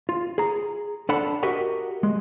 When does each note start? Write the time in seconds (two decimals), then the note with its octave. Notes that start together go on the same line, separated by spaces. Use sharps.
0.09 F4
0.38 G#4 A#5
1.09 D4 A4 F5 F#5 A5 B5
1.43 F#4 G4 A#4 D#5 E5 F#5
2.03 G#3